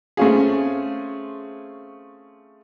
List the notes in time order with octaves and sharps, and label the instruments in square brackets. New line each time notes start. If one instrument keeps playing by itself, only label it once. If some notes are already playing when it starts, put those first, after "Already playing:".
[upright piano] A3 C4 C#4 F4 G#4